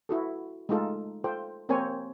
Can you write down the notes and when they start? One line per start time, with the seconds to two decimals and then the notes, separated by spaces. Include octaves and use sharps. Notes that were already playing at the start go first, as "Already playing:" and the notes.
0.09 E4 F#4 A4
0.69 G#3 A3 D#4 F4 A4
1.24 F4 A4 C5 G5
1.69 A#3 C4 A#4 C5 C#5 G#5